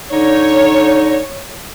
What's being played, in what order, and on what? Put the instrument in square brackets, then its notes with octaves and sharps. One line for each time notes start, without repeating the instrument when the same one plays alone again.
[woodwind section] D3 D#4 [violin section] C#5